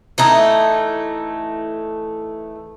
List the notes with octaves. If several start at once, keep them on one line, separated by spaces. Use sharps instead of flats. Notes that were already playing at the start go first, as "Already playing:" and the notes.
E3 A3 D#4